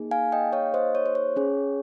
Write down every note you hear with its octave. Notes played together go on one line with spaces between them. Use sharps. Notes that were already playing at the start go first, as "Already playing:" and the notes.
Already playing: A#3 D#4 G#4
F5 G#5
D#5 G5
C#5 F5
C5 D#5
C#5
C5
C#5
C#4 G#4